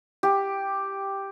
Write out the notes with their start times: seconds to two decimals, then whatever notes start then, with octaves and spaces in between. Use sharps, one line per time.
0.23 G4